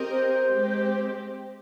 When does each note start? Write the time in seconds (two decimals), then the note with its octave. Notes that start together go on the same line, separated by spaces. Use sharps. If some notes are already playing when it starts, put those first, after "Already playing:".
Already playing: C4 G4 A#4 D#5
0.10 C5
0.52 G#3 C4 G4